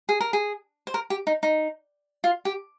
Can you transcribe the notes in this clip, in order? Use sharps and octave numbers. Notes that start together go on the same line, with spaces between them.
G#4
A#4
G#4
C5
A#4
G4
D#4
D#4
F4
G4